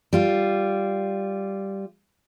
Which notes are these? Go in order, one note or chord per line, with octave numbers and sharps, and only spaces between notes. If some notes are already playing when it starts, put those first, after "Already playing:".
G3 F4